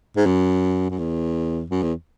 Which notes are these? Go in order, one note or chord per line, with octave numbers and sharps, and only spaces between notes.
G#2
F#2
F#2
E2
F#2
E2